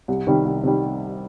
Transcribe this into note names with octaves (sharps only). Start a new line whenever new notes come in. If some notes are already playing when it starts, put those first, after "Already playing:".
C2
C3 D#3 G3
C2
C3 D#3 G3